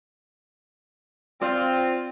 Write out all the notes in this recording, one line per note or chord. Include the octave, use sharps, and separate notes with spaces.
C4 F4 D5